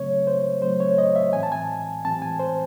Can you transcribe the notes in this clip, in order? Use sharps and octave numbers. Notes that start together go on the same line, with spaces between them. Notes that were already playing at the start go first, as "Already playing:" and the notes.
Already playing: C#3 F#3 A3 C4 C#5
C5
C#3 F#3 A3 C4 C5
C#5
D#5
E5
A2 E3 C4 G#5
A5
G#5
A2 E3 C4 A5
G#5
C5